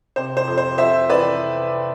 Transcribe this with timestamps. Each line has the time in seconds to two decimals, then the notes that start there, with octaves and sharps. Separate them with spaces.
0.16 C3 C5
0.37 C5
0.48 F2
0.58 C5
0.78 F2 C5 E5
1.10 E3 B4 D5